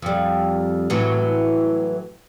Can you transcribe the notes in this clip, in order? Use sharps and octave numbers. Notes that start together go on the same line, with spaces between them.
F2 G3
A2 E3 F#3